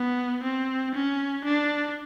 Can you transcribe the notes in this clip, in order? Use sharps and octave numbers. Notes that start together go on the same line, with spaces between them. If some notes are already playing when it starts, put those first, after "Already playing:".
Already playing: B3
C4
C#4
D4